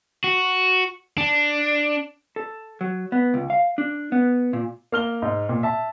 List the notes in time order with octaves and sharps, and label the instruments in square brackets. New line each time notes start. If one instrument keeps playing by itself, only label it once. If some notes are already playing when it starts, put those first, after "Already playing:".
[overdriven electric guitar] F#4
D4
[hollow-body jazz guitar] A4
F#3
B3
C#2
F5
D4
B3
A#2
[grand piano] A#3 F6 G7
G#2
A#2
E5 A5